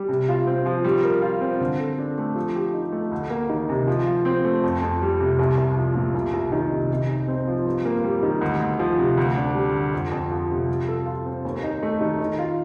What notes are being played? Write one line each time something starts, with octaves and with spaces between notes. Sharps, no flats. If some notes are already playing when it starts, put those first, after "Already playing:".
Already playing: G3
C3
F4
C4
F3
G3
A#4
F4
C4
D3
A4
D4
A3
F3
G4
D#4
A3
D2
A#3
D#3
C3
F3
F3
C4
A3
F2
F2
G3
C3
C2
C2
F3
A#2
C2
C2
D#3
C3
C3
D#4
C4
F3
G2
A#3
G3
D#3
D2
D2
F3
C3
D2
D4
G3
D3
F2
F2
F3
C3
G3
A4
F4
C4
D#2
D#4
A3
D#3
D#3
F4